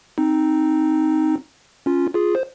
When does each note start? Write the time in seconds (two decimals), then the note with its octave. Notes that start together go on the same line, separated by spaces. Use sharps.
0.18 C4 D#4
1.86 C#4 F4
2.14 F4 G#4
2.35 C5